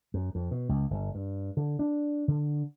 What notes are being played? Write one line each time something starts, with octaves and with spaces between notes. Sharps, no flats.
F#2
F2
B2
C#2
G1
G2
D3
D4
D3